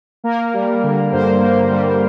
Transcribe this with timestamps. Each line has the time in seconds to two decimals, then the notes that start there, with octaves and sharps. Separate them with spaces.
0.24 A#3 A#4
0.54 G3
0.83 D3
1.12 G2 C5
1.42 A#3
1.71 G3